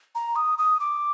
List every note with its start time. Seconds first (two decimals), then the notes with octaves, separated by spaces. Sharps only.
0.15 A#5
0.36 D#6
0.58 D#6
0.80 D6